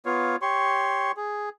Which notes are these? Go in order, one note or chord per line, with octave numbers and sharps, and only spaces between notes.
B3 F4 C#5 F5
G4 C#5 C6 C#6
G#4